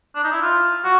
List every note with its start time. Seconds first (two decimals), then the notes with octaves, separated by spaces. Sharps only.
0.15 D4
0.24 D#4
0.33 E4
0.42 F4
0.84 F#4